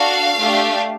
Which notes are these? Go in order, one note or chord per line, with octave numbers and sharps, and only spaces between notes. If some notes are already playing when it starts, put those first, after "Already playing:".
Already playing: D4 F#4 A4 F5
A3 D4 G4